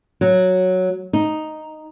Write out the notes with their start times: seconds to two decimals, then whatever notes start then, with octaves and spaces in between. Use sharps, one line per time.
0.21 F#3
1.13 D#4